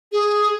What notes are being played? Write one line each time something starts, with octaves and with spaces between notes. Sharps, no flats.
G#4